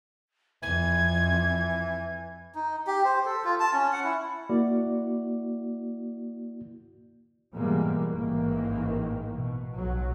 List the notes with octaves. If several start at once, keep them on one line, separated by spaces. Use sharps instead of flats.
F2 E3 G#6
D#4
G4
C5
A4
F4
A5
C#4
F#5
E4
A#3 E4 F#4 D5
G#2 B2 E3 G3 G#3 A#3
A1 G#2 D#3 E3 A#3
B2
B1 F#3